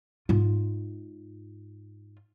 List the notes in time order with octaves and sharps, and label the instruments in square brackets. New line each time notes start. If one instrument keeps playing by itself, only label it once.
[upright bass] G#2 F4